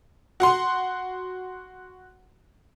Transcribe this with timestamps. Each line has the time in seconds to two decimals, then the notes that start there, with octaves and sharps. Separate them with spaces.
0.40 F#4 F#5 C6